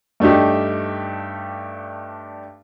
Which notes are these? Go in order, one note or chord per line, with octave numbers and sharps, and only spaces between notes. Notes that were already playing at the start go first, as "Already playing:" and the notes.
G2 A3 D4 D#4 G4